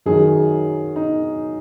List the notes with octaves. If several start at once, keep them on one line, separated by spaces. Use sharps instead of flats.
F#2 D#3 F#3 G#4
D#4